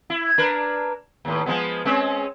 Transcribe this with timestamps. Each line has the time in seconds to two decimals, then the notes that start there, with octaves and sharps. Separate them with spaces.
0.10 E4
0.38 D4 A#4 B4
1.25 D#2 A2
1.46 F3 G#3 B3
1.85 G#3 C4 C#4